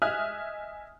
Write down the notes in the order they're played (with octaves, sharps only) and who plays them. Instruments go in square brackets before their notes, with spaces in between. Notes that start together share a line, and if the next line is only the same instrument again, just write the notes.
[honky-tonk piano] D#5 E5 G#5 D#6 F6 F#6